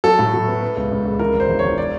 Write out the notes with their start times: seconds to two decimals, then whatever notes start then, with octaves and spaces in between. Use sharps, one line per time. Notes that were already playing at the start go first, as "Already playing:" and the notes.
0.04 F#3 A4
0.19 A2
0.33 F#3
0.48 B3
0.62 B3
0.77 C#2
0.92 C#2
1.06 C#2
1.19 E3 A#4
1.34 E1
1.40 C5
1.49 E1
1.59 C#5
1.64 E1
1.78 D5